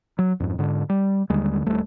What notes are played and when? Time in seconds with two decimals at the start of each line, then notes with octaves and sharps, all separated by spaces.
0.19 F#3
0.40 F2 G#2
0.59 G#2 D3
0.89 G3
1.30 D#2 D3 G3 G#3
1.66 D#1 G3 A3